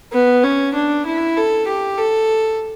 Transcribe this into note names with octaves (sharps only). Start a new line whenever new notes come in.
B3
C#4
D4
E4
A4
G4
A4